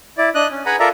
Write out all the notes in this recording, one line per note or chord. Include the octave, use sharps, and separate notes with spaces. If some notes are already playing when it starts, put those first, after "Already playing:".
E4 D5
D4 D#5 F#6
C#4
G#4 B4 F#5 G#5 A#5 B5
F4 A4 A#4 D5 E5 A#5